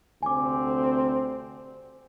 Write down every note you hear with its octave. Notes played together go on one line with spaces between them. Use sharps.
D2 C3 C4 G#5 D6